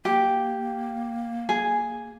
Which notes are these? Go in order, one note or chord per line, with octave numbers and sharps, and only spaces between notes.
A#3 G4
G#4